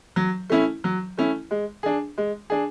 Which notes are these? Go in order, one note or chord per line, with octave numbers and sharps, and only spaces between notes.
F#3
A3 C#4 E4
F#3
A3 C#4 E4
G#3
D4 G#4
G#3
D4 G#4